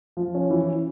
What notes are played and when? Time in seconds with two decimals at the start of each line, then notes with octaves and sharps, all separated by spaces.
0.17 F3
0.35 C#4
0.50 E3